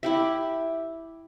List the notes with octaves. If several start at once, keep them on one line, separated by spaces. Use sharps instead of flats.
E4 G4 E5